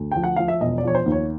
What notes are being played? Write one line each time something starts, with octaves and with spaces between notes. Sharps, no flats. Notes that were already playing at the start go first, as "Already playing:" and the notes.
Already playing: D2
F3 G5
F#5
F3 F5
E5
E1 D#5
D5
F3 C#5
C5
D#2
C#5